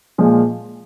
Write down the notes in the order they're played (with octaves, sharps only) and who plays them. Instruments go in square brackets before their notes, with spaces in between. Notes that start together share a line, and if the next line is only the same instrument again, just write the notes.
[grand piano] A#2 F3 G#3